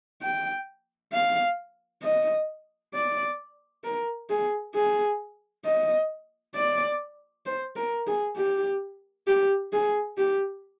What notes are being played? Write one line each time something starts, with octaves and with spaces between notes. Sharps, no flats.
G5
F5
D#5
D5
A#4
G#4
G#4
D#5
D5
C5
A#4
G#4
G4
G4
G#4
G4